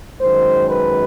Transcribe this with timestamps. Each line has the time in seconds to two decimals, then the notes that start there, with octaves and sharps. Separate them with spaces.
0.20 F#2 D#3 G#3 C5
0.68 B4